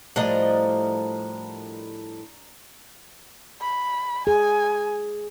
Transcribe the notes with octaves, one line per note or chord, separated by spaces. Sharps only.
A2 F3 G3 D4 A#4 D#5
B5
G#4 G#5